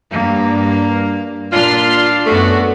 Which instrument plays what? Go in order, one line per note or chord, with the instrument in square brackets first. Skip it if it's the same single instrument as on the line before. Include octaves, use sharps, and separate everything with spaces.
[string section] G2 [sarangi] A#3
[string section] A#2 C6 F6 [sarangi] D4 [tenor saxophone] F4
[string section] F#2 B3 F#4 [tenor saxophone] A3